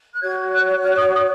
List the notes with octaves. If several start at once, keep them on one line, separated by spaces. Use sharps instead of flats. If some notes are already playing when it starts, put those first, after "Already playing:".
F#6
F#4 C#5 G#6
F#6
F6
D#6
D#6